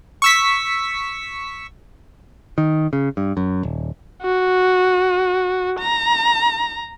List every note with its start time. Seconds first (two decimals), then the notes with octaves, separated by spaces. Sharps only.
0.22 C#6 E6 B6
2.58 D#3
2.93 C#3
3.17 G2
3.37 F#2
3.63 D#1
4.22 F#4
5.79 A#5